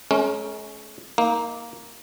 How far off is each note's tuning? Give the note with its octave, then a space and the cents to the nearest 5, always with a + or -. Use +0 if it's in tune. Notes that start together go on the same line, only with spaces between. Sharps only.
G#3 +45 C#4 +0 A#4 +15
A#3 +0 D#4 +40